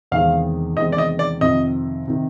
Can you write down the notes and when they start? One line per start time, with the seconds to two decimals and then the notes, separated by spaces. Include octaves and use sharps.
0.11 E2 C3 D#3 G#3 C4 F5
0.77 E2 C3 D#3 G#3 C4 D#5
0.92 D5
0.98 D#5
1.19 D5
1.41 F2 C3 D#3 D#5
2.08 C3 D#3